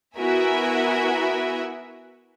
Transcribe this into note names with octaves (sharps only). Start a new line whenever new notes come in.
B3 E4 F#4 A#4 E5 G#5